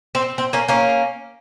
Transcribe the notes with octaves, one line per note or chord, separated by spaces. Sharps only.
C4
C4
A#3 C#4
A#3 C#4